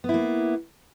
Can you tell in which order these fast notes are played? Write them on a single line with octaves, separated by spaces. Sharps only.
B3 E4 A#3